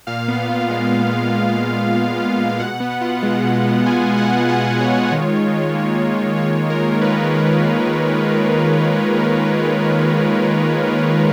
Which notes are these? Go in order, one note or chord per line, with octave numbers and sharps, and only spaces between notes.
A#2 F5
B3
F4
G#3
A#2
B3
F4
G#3
A#2
B3
F4
G#3
F5
B2 F#5
B3
F4
G#3
B2
B3
F4 G#5
G#3
F#5
B2
B3 F#5
F4
C#5
G#3
D#3
F4
D#3
A#3
D#3
F4
D#3 C#5
A#3
A#4
D#3
F4 B4
D#3